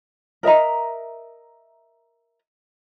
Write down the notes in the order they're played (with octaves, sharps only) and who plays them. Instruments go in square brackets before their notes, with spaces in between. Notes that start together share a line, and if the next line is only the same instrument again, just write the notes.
[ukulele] A#4 D#5 E5 A#5